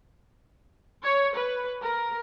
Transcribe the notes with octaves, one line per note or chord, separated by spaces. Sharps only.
C#5
B4
A#4